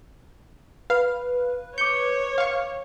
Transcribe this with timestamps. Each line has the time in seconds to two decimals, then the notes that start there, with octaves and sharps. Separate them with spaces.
0.90 B4 F5
1.78 C#5 D6 G6 C#7
2.38 F5 C#6